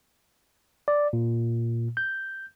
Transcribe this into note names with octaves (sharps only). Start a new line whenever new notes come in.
D5
A#2
G6